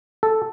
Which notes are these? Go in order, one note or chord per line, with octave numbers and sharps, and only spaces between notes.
A4